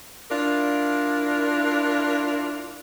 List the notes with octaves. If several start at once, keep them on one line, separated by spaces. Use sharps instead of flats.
D4 E4 F4 A#4 D5